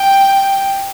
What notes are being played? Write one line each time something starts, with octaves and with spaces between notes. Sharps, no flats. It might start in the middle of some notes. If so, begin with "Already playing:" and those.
Already playing: G5